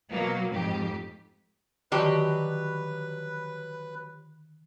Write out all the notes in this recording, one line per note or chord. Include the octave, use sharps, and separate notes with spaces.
B2 F#3 A#3
F2 G#2 G4
D3 D#3 F3 F#3 F#4 G4 B4